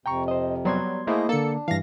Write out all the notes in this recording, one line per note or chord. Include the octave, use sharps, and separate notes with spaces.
F2 C3 G5 A#5 C#6
C5 D#5
F#3 G3 B3 C6 G#6
A3 A#3 E4 G#4 C5 D#5
D3 A#3 D4 A4 C#7
G2 E3 F5 A#6